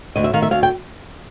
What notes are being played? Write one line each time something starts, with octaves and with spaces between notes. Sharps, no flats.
D2 D#5
E5
D#3 F5
E5
D2 F5
G5